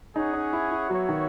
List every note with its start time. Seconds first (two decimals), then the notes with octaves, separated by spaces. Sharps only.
0.15 C#4 D#4 G#4 C#5 F#5
0.33 D#4
0.53 E4
0.71 E4
0.89 F#3 B3 F#4 C#5 E5
1.09 D#3